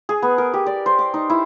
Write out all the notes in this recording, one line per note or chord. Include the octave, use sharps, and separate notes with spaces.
G#4
B3
A#4
G4
D5
C5
D6
D#4
E4